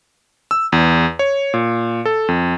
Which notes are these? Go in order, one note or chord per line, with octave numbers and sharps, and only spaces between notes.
E6
E2
C#5
A#2
A4
F2